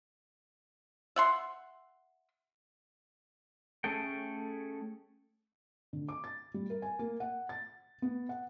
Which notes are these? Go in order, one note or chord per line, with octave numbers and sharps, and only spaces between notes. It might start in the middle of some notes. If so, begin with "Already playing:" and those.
E5 F#5 C6
A3 C#4 G#4 A4 G5
D3
D6
A6
G3
A#4
G#5
A#3
F#5
A6
B3
F#5